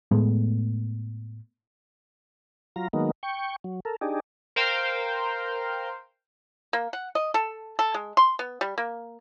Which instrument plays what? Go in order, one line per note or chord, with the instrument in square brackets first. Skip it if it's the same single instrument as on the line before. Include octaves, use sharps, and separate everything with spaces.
[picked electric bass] A2 G#3 A3 B3
[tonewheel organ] F#3 F4 A#5
D#3 F#3 G#3 A#3 B3 D#4
G5 C#6
F#3
A4 A#4
D4 D#4 G4 G#4
[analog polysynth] A#4 C5 F5 G5 C6
[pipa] A#3
F#5
D#5
A4
A4
G#3
C6
B3
G3
A#3